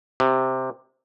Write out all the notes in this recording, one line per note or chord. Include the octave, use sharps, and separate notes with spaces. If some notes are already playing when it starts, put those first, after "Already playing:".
C3